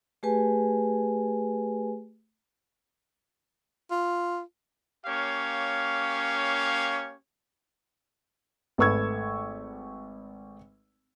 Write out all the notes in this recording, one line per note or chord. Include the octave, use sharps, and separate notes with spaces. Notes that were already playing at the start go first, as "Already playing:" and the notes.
A3 G4 G#4 B4 G#5
F4
A#3 C#4 G4 C#5 F5
G#1 A3 B4 C#6 E6 G#6